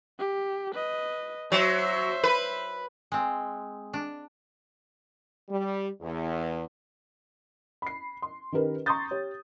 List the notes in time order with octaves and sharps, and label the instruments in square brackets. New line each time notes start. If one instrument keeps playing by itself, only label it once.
[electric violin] G4
B4 D#5
[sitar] F#3 [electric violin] C5 E5
[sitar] B4
[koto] G#3 C4
D4
[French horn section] G3
E2
[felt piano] B5 C7
C6
D#3 C#4 D#4 G4 A#4 B4
A#5 C6 C#6 D#6 G6 A6
G4 C#5